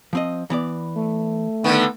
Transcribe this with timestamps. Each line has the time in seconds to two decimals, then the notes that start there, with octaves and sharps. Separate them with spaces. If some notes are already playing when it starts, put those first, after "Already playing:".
0.13 F3 C4 D#5
0.50 E3 B3 D5
0.95 A3
1.64 D3 D#3 B3